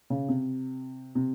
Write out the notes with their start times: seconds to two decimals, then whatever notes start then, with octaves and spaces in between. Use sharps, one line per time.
0.10 C#3
0.29 C3
1.15 C3